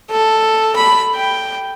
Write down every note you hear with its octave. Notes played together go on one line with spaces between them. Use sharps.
A4
B5
G5